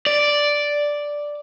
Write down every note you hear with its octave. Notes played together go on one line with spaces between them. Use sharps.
D5